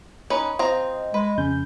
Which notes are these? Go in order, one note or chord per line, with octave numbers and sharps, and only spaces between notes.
C#4 D#4 B4
C4 F4 D#5 A#5
G#3 B4
F2 C#3 C#4 G6